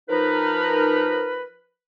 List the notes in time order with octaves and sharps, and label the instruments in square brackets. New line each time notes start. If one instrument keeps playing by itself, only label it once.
[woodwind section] F3 D#4 A#4 B4